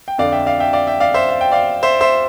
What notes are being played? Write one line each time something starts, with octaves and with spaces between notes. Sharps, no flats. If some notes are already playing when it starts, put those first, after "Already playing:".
G5
F2 D3 D5 F5
E5 G5
D5 F5
E5 G5
D5 F5
E5 G5
D5 F5
C5 E5
F5
G5
D5 F5
C5 E5
C5 E5